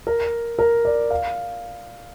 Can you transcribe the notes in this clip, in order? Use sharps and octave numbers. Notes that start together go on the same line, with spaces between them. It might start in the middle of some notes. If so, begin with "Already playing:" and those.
A#4
A#4
D5
F5